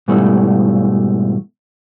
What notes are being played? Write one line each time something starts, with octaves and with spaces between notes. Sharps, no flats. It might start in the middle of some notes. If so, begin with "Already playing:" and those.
G#2 B2 E3 G3 A3